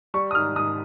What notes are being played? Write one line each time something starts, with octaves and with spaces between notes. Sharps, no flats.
G3 C#6
D#6
G#2 F6
G#2 D#6